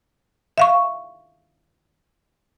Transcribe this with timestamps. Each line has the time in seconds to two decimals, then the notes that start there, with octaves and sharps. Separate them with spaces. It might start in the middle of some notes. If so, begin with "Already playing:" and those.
0.58 E5 F5 C#6